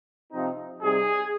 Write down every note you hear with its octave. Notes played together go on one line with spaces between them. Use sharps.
C3 F3 C4 D#4
C3 G3 C4 D#4 G#4